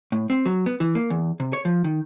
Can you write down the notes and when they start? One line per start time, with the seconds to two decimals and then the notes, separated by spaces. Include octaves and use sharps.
0.12 A2
0.30 C4
0.46 F#3
0.66 B3
0.80 E3
0.95 A#3
1.10 E2
1.40 C3
1.53 C#5
1.65 F3
1.84 D#3